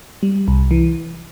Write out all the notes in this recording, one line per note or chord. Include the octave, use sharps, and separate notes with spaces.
G3
C2
E3